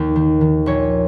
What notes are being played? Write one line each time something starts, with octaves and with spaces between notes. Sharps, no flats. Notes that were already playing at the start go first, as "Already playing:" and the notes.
Already playing: D#2
D#3
D#3
A#1 C#5